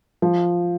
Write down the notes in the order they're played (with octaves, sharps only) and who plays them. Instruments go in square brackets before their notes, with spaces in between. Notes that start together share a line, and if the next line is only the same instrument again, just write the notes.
[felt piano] F3